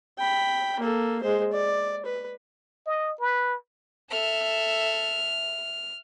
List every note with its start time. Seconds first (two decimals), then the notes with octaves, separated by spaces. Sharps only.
0.19 G5 B5
0.79 A#3 A4
1.22 G#3 C5
1.52 D5
2.05 B4
2.87 D#5
3.20 B4
4.10 A4 E5 F6